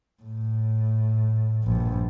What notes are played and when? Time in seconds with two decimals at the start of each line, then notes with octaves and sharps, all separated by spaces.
0.23 A2
1.64 A#1 G2